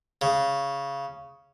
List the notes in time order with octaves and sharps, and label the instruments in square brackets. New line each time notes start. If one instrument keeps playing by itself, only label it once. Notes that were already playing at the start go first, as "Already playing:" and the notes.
[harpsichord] C#3